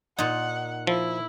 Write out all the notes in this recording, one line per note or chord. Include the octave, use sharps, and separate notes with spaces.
A#2 D#4 F#5
F3 E4